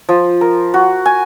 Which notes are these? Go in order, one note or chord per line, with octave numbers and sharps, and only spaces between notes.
F3
A#4
F#4
G#5